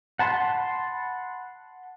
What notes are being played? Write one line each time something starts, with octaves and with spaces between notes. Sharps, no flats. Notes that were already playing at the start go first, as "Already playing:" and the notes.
F#5 A5 B5 C6